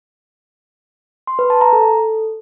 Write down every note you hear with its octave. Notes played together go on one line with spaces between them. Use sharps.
C6
B4
A5
A#5
A4